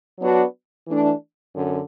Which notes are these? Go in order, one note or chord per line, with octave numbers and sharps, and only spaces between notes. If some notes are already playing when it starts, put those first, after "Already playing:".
F#3 B3 D4 F#4
E3 A3 D4
F#2 D3